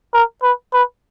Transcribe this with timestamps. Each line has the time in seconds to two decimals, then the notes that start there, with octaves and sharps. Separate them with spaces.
0.14 A#4
0.43 B4
0.74 B4